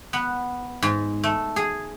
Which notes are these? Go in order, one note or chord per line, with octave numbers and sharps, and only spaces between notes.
B3
G#2
A3
G#4